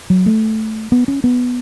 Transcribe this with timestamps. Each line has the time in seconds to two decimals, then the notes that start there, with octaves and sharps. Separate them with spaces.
0.10 F#3
0.26 A3
0.92 B3
1.08 C#4
1.24 B3